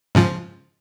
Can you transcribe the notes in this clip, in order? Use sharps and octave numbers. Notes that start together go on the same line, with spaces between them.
G#2 C#3 F3